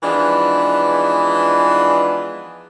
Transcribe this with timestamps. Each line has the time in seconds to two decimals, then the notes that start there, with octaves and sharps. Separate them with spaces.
0.03 E3 F3 G#3 B3 D4 D#4